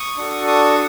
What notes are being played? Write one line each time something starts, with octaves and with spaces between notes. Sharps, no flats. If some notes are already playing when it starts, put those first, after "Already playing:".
Already playing: C#6 D#6
D4 F#4 A4
C#6 D#6